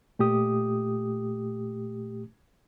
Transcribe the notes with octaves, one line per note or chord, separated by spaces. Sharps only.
A#2 A3 G4 D#6